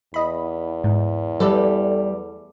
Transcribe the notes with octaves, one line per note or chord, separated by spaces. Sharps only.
E2 D#5 B5
G#2
G3 A4 B4 D5